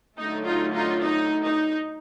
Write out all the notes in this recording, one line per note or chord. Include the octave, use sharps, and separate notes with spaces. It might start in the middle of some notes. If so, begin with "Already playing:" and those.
D3 F#3 A3 D#4
D#4 F4
D#4 F4
D#4
D#4